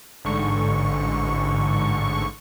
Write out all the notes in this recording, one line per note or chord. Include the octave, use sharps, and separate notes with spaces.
A1 G#2 D3 C#6